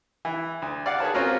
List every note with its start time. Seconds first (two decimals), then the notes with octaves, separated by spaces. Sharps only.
0.25 E3
0.62 D2
0.86 D5 F5 F#5
1.00 G#4 B4 C#5 A5
1.14 C4 C#4 F4 F#4 A#4